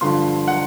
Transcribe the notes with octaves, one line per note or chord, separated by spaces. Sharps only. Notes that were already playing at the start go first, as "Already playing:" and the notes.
G2 D3 F3 C6
F#5